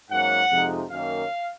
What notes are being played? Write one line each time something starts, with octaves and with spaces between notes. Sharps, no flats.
G#2 F#3 A#3 C#4 F#5
F2 C3 F3 G#3 D#4
F#2 D#3 A#3 C#4 F5